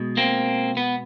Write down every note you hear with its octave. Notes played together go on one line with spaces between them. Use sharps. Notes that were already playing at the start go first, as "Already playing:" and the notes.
Already playing: B2 G#3
A#3 C4
B3